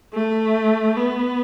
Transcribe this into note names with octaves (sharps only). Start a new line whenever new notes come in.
A3
B3